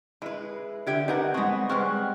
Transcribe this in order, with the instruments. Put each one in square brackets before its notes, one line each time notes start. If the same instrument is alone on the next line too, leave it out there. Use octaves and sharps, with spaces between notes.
[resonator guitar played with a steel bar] G#3 B4 [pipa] E4
[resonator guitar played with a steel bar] D3 G4 E5 [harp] G6 G#6 D7
[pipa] G3 B3 D4 [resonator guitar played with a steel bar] D#4 A#4 F#5
[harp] G#3 D#5 [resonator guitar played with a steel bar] B3 C4 [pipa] F#4
[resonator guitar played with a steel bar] G3 G#3 [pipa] B3 C4 C#6 [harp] F6 F#6